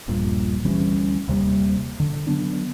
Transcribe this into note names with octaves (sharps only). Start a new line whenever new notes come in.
D#1 A#1 G2 A#2
D2 E3 G3 C#4
D#1 C3 G3 A#3
D3
D3 F#3 B3 D4